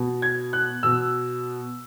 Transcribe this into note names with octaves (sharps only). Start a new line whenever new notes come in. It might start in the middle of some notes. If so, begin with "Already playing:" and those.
Already playing: B2
G#6
F#6
B2 E6